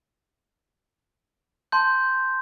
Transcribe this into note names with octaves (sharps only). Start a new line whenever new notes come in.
A5 C6 G6